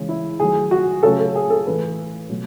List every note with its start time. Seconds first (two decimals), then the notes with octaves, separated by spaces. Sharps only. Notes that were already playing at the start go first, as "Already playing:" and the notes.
Already playing: C#3 E3 G#3
0.09 E4
0.39 D#3 F#3 A3 G#4
0.71 F#4
1.03 C#3 F#3 A3 A4
1.19 A4
1.35 G#4
1.50 A4
1.66 A2 E3 A3 B4
2.29 B2 F#3 A3